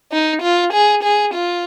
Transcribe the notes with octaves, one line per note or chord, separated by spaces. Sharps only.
D#4
F4
G#4
G#4
F4